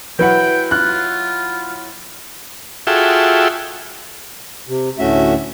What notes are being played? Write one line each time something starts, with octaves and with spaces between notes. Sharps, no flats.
F#3 E4 B4 F#5 G5
F4 F#6
F4 F#4 G#4 A4 E5 G5
C3
D2 A2 A3 C#4 F#4 E5